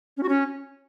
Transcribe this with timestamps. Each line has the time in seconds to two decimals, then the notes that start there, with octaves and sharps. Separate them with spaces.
0.17 C#4
0.23 F#4
0.29 C#4